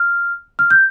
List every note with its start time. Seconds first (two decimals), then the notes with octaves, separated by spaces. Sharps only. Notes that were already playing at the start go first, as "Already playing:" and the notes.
Already playing: F6
0.59 F6
0.71 G6